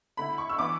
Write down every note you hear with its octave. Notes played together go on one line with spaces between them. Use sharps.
D3 A3 E4 B5
C#6
E6
E3 B3 D4 D6